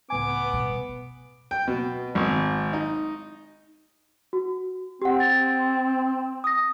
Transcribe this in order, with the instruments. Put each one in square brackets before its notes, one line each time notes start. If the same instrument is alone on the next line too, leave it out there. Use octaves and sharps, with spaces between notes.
[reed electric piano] C#2 A2 G#5 [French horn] B3 [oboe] D6
[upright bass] B2 G3
[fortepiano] G5
B2
G#1
D#4
[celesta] F#4
[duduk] C4 [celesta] G4 F#5
[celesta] A6
D#6 A#6